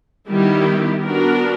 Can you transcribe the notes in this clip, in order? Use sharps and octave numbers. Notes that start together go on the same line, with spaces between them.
D#3 G3 B3 E4 G4
B3 D4 F#4 A#4